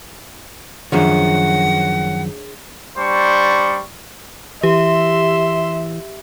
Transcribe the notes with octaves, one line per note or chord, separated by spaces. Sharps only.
F#2 D#3 F3 D4 G#4 C#5 F#5
G3 D4 C5 C#6
E3 G4 E5 C6